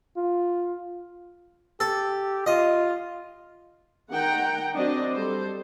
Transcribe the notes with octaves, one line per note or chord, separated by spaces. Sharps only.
F4
G4 A4
F4 D#5
D#3 F#5 G5 A#5
F#3 C4 D4 F#4 D5 D#5
G3 A4 C5